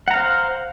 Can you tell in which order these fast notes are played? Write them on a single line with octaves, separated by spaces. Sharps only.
F#5 A#5 F5 C5